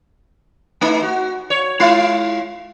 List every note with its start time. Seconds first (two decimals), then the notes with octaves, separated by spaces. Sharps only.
0.81 A3 D#4
1.03 F#4
1.50 C#5
1.79 G#3 E4 F4